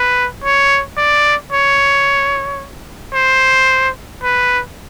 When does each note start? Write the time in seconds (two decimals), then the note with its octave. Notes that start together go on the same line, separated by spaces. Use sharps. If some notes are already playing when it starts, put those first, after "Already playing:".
Already playing: B4
0.44 C#5
0.97 D5
1.52 C#5
3.14 C5
4.23 B4